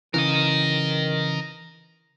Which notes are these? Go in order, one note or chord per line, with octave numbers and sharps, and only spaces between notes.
C#3 E3 A#4 D#5